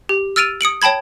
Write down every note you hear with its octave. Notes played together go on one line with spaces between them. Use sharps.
G4
E6 F6 A6 D7 D#7 F7
D#6 C#7 D7 F#7
C#5 G5 A5 B5 G#6